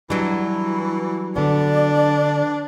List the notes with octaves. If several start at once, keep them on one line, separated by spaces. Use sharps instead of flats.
E3 F#3 G3 D4
D3 B3 D4 D5